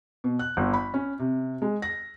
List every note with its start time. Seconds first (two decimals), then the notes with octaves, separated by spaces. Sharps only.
0.24 B2
0.39 F#6
0.57 G1
0.74 B5
0.94 C#4
1.19 C3
1.62 G#3
1.82 A#6